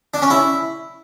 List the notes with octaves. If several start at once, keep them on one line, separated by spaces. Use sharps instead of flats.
D4
C#4
E4